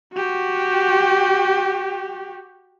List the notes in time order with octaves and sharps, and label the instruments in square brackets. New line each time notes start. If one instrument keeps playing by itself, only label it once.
[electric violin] F#4 G4